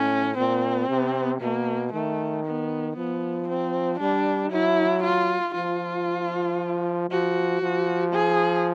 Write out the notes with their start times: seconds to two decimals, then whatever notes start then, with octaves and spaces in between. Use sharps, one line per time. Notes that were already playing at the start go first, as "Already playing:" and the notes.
Already playing: A2 C#4
0.38 A#2 C4
0.89 C3
1.41 B2 A#3
1.93 D#3 A3
2.45 B3
2.97 F3 B3
3.48 C4
3.99 G3 D4
4.51 F#3 E4
5.03 F4
5.54 F3 F4
7.10 F3 F#4
7.62 F3
8.13 G#4